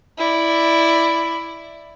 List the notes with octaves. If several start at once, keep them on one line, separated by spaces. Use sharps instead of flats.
E4 D5